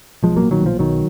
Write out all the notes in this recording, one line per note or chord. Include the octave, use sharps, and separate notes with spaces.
B1 F3 G#3
F#3 A#3
A#2
D#3 F#3
B1
F3
B1 D#3 F#3